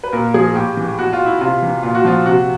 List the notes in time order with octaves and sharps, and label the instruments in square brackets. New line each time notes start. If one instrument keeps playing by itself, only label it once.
[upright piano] B4
A#2 A#4
F3 G#4
A2 G4
E3
B2 F#4
F4
E4
C3 F4
E3
A#2 F4
F#4
F3 F4
C3 F#4